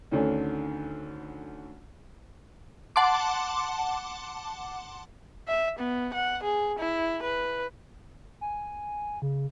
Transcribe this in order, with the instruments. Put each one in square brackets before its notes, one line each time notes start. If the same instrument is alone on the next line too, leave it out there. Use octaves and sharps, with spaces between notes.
[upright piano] D2 D3 D#3 C#4
[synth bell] F#5 A5 C6 D6
[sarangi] E5
B3
F#5
G#4
E4
B4
[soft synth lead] G#5
C#3